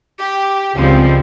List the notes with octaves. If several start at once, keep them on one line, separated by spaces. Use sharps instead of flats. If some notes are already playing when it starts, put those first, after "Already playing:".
G4
C#2 F3 G3 G#3 C4